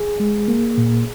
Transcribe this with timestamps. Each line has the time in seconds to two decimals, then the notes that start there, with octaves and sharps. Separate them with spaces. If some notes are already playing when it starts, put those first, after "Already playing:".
Already playing: G#4
0.20 G#3
0.48 A#3
0.78 A#2